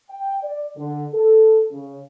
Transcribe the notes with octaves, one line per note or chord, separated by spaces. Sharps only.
G5
D5
D3
A4
C#3